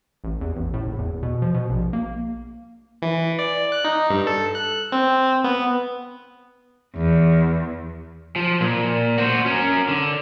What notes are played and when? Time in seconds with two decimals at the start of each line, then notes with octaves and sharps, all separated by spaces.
0.24 A1
0.41 E2
0.56 A1
0.74 A2
0.87 F#1
0.99 E2
1.23 B2
1.42 F3
1.54 B2
1.69 A#1
1.93 A#3
3.02 E3
3.39 D5
3.72 F#6
3.85 D#4
4.10 G2
4.27 A4
4.55 F#6
4.92 C4
5.44 B3
6.96 E2
8.36 F3
8.61 A#2
9.18 F#4 C5
9.46 C#4 A#4
9.88 D3